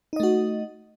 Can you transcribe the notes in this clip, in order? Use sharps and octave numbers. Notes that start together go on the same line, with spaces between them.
A3 D#4 F#4 D#5